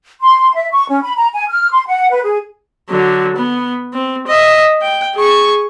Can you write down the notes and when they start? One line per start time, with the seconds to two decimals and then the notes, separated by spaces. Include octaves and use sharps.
0.20 C6
0.55 E5
0.72 C#6
0.89 C#4
1.03 B5
1.17 A#5
1.34 G#5
1.50 F6
1.71 C6
1.87 F#5
2.10 B4
2.24 G#4
2.90 D3 F#3
3.36 B3
3.93 C4
4.27 D#5 E5
4.82 G5
5.15 G#4 C#6